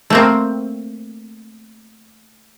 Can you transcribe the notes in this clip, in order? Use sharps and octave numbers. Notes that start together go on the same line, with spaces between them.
A3 A#3 C4